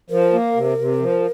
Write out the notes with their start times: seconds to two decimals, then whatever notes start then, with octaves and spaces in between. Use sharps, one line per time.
0.10 F3 A#4
0.32 A#3
0.55 C3
0.78 C3
1.00 F3